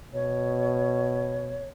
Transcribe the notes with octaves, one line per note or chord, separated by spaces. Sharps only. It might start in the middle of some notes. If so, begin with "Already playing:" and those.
B2 C#5